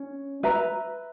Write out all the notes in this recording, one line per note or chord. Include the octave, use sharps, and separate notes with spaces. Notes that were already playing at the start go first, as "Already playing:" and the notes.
Already playing: C#4
B4 E5 A#5